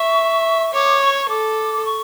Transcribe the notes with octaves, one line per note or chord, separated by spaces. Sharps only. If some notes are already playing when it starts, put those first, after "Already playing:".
Already playing: E5 C#6
C#5 D6
C#6
A4 D6
C#6